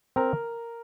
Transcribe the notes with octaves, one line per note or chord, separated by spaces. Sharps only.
C4 A#4